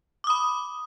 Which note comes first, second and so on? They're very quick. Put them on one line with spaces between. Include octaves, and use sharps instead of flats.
D6 D#6 B5